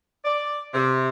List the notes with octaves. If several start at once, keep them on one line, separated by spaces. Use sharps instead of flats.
D5
C3